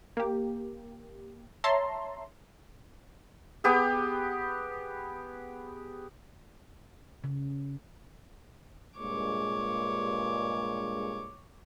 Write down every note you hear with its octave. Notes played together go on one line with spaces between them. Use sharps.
A#3 G4
C#5 E5 A5 A#5 C6
B3 G4 G#4
C#3
G2 A#2 G#3 C#5 D6